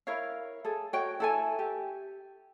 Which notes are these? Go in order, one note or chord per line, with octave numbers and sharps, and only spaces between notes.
E4 A#4 C#5 F5
G#4 A4
F#4 C#5 G5
E4 A4 G#5
G4